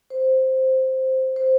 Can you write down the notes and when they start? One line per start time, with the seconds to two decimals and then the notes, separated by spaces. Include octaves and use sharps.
0.10 C5
1.36 C5